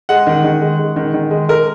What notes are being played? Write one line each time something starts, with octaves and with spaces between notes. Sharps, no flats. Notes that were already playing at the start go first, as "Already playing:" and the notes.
G#3 F#5
D#3
D#3
G#3
G#3
D#3
D#3
G#3
G#3 A#4